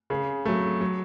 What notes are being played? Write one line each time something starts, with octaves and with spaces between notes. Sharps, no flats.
C#3 G#4
F#3 A3
F#3